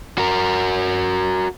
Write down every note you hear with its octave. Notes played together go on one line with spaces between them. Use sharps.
F#4 A#4